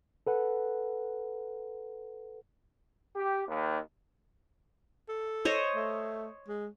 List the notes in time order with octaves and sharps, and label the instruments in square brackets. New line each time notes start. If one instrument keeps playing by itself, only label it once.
[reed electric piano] A4 B4 F#5
[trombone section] G4
D#2
[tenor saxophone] A4
[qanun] C5 C#5 D#5
[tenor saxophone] A3
G#3